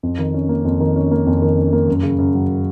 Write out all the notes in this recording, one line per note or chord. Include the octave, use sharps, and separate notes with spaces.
F2
D#3
C#4
A#3
F2
D#3
C#4
A#3
F2
D#3
C#4
A#3
F#2
C#3
F#2
F#3